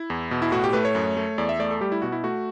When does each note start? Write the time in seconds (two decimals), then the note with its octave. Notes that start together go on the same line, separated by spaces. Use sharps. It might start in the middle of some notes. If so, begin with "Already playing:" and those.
Already playing: E4
0.10 E2
0.31 B2
0.42 E4
0.52 A2 F#4
0.64 G4
0.73 A3 B4
0.85 C#5
0.95 F#2
1.17 A3
1.38 E2 D5
1.49 E5
1.59 A3 D5
1.71 A4
1.81 G3 G4
1.92 E4
2.02 B2 F#4
2.12 E4
2.24 A3 F#4